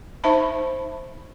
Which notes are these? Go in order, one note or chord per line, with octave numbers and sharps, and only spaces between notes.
D#4 C5 E5 A5 B5